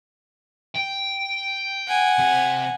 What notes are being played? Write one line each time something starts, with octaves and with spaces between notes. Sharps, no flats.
G5
F#5 G#5
C3